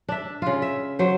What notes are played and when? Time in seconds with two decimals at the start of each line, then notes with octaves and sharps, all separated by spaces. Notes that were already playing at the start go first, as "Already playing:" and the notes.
0.09 D4 E5
0.42 C#3 F4
0.62 E5
0.99 F#3 C5